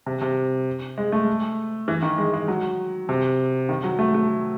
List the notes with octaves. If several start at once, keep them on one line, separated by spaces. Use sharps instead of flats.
C3
C3
G#3
A3
E3
D#3
G#3
G#3
F#3
C3
D#3
F#3
A3
A3